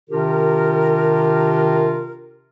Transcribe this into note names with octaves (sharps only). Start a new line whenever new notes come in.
C3 D#3 D4 F4 G4 A#4